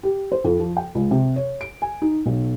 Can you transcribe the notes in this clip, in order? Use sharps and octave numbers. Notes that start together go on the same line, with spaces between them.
G4
C5
F2
F3
G5
C#2
C3
C#5
D7
G#5
D#4
B1